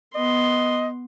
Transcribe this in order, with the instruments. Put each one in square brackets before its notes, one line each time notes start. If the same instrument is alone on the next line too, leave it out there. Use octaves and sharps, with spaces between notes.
[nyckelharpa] B3 C6 [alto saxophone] D#5